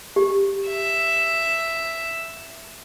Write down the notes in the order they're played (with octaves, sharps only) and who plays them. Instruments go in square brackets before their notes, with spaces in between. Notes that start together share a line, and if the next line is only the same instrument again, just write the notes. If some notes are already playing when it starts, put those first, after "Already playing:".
[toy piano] G4
[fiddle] E5